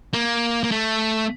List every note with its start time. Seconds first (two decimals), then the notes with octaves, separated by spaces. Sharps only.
0.13 A#3
0.63 A#3
0.71 A3